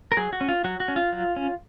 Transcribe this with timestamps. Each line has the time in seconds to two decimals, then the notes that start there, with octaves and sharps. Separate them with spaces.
0.12 A#4
0.17 F#3 G#4
0.33 F#4
0.41 C#4
0.49 F4
0.64 F#3 F#4
0.80 F#4
0.88 C#4
0.96 F4
1.13 F#3
1.36 C#4